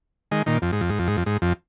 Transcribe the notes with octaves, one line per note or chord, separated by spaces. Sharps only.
D#3 G#3
A#2 D#3
F2
G#2
F2
G#2
F2
G#2
F2
G#2
F2